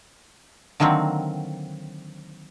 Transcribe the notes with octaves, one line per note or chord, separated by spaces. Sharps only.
D3 D#3 F#3 A#3 C4